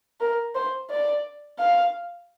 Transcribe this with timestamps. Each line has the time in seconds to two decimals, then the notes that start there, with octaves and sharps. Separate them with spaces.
0.20 A#4
0.55 C5
0.90 D5
1.59 F5